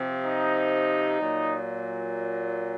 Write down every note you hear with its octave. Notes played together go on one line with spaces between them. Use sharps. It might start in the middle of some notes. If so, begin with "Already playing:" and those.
Already playing: C3 F3
D#4
A#2 F#3